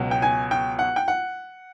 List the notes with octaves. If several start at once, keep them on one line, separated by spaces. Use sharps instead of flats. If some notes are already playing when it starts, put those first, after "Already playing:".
Already playing: C#2 B2 F#3
G5
G#5
G5
F#5
G5
F#5